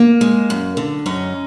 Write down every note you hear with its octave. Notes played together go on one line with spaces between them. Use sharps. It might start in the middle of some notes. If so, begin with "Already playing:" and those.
Already playing: A#3
G#3
F#2
D3
F#2 C#4 D#4